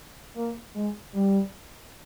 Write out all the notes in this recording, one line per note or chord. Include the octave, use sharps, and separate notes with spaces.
A#3
G#3
G3